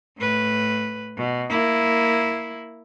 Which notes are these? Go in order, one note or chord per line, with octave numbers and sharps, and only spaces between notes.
A2 B4
B2
A#3 E4